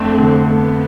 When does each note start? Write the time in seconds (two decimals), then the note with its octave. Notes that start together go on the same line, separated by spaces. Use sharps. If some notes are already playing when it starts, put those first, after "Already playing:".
Already playing: F2 A3 C4 D4
0.18 D3
0.46 A3 B3